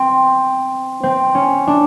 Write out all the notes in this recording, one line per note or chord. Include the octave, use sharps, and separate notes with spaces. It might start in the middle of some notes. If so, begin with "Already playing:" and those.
Already playing: C4
C4
C#4
D4